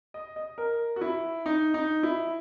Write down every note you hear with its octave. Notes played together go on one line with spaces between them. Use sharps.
D#5
D#5
A#4
F#4
E4
D#4
D#4
E4